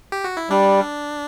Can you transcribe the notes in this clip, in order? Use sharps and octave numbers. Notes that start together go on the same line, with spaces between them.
G4
F#4
E4
G3 D4